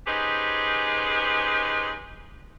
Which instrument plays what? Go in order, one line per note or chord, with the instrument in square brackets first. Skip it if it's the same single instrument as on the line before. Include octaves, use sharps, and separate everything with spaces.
[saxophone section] C#4 D#4 G4 G#4 B4 C5